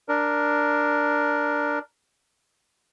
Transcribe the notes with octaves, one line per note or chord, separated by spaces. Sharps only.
D4 A#4